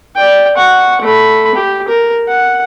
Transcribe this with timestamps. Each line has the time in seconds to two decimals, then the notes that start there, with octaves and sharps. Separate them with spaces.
0.16 D5 G5
0.56 F#5 C#6
1.01 A3 B5
1.55 G4
1.88 A#4
2.28 F#5